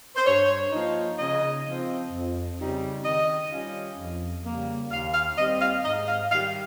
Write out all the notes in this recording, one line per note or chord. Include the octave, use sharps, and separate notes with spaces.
C5
G2 C#5
F3 A#3 D#4
C#3 D#5
F3 C4 F4
F2
C#3 G3 C4 D#4
D#3 D#5
G3 C#4 F4
F2
C#3 G3 A#3
D#2 F5
F5
D#3 G3 C4 D#5
F5
G#2 D#5
F5
D#3 G3 F5